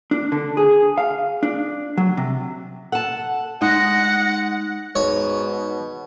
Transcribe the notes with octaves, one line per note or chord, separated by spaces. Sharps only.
D4
D3
G#4
F5
D4
F#3
C3
A4 F#5 A5
G#3 D#4 F#5 A#6
G#2 B2 C#5